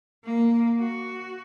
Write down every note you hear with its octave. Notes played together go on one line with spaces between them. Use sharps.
A#3
F#4